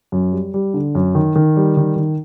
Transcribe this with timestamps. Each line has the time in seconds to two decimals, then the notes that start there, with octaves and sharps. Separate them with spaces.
0.12 F#2
0.32 G3
0.54 G3
0.74 D3
0.95 F#2
1.15 D#3
1.36 D#3
1.56 G3
1.77 D#3
1.96 D#3